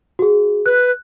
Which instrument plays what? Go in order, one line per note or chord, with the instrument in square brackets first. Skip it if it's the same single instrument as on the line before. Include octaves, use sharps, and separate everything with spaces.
[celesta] F#4 G#4
[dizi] B4 [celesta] F#6